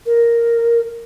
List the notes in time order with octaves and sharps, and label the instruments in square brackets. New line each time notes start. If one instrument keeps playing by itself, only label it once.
[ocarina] A#4